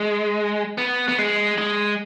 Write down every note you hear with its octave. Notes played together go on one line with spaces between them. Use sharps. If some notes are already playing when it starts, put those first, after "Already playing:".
Already playing: G#3
B3
B3
G#3
G#3